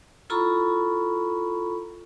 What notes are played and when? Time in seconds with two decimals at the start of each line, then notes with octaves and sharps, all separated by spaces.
0.30 E4 F4 A4 A#5 B5 C#6